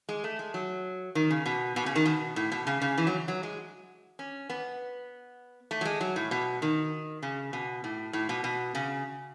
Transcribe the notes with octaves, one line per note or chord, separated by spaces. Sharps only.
G#3
A3
G#3
F#3
D#3
C#3
B2
B2
C#3
D#3
B2
A2
B2
C#3
C#3
E3
F#3
F#3
G#3
C#4
B3
A3
F#3
G#3
F#3
A2
B2
D#3
C#3
B2
A2
A2
B2
B2
C#3